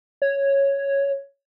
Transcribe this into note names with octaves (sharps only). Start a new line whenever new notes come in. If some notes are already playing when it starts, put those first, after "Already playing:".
C#5